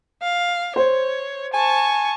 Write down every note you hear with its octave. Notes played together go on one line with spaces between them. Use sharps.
F5
C5 C#5
G#5 A5 C#6